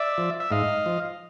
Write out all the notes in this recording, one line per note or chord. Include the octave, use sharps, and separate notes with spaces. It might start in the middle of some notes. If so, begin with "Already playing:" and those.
Already playing: D5 E5
F3
E5
G#2 D#5 F5
F3